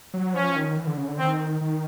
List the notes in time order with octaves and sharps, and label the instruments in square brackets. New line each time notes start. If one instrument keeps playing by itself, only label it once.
[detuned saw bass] F#3
[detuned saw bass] F3 [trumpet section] C#4
[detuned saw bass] D#3
E3
D3
C#3
D3
[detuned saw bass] D#3 [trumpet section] C4
[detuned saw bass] D#3